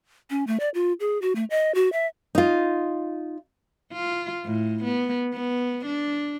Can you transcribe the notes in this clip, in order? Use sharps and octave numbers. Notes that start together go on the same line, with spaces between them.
C#4
A3
D5
F4
G#4
F#4
A3
D#5
F#4
E5
D#4 F4
F4
A2
B3
B3
D4